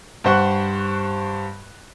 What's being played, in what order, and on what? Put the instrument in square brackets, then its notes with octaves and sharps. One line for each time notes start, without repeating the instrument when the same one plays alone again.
[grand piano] G2 G4 C5 F#5 C#6 F#6